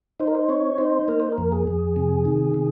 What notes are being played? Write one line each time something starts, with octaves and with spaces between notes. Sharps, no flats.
D#4 C5
A#4
C5
C4 C#5
D#4 C5
A#3 A#4
C5
A#4
F2
G#4
F2
C3
D#3
C3